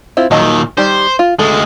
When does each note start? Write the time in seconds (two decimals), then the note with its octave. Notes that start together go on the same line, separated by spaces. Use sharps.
0.17 C4 E4 F4
0.31 A#2 D#3 F#3 D#5 A5
0.77 D#3 G3 G4 C5
1.19 F4
1.39 D2 G#3 A4